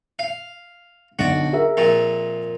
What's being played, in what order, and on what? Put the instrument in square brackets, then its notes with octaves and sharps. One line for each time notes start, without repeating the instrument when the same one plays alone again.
[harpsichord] F5
[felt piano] B1 D3 [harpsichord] F#4 D5
[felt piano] G#4 A#4 E5
[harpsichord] F2 A#2